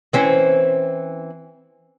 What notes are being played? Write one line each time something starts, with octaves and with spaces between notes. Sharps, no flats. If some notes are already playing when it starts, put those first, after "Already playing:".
E3 C4 C#4